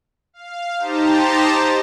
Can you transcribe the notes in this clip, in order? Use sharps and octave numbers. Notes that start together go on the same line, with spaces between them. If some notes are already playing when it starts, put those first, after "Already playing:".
F5
D#4 G4 C5 A5 A#5